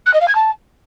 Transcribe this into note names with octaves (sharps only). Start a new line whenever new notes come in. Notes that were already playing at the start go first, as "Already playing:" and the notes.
F#6
D#5
F5
G#6
A5